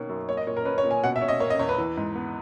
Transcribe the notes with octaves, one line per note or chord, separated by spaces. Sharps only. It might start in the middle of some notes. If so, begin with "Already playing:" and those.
Already playing: B2 D#3 A#3 C#4
F#2
A#3 C#5
D#5
A#2 C#5
A#4
C#4 B4
C#5
A#2
G#5
B2 F#5
E5
C#4
D#5
A#3 C#5
D#5
E2 C#5
B4
E3
G#2
B3